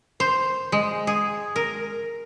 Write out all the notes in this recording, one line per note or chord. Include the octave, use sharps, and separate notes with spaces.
C5
G#3
G#4
A#4